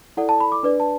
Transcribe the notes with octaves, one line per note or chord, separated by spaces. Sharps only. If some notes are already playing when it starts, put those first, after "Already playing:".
E4 A4 D5 F#5
A5
B5
D6
D4 B4 D5
A5